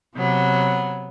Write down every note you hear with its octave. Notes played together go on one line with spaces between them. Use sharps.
C3 F#3 B3